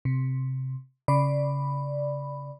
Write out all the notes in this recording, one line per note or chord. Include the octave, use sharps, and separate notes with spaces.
C3
C#3 D5 B5